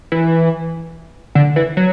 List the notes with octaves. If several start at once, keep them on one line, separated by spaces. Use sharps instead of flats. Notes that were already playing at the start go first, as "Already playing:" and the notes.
E3
D3
E3
F#3